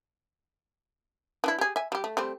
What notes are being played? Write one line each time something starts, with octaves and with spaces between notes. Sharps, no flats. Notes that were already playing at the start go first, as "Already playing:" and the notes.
E3 D4 E4
G4 G#4
E5 G#5
G3 G4
A3
G3 A3 C4